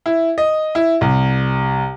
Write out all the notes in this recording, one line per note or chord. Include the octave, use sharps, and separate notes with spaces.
E4
D#5
E4
C2